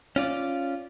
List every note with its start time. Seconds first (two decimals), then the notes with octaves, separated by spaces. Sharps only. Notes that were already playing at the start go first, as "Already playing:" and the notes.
0.16 C#4 F4 D5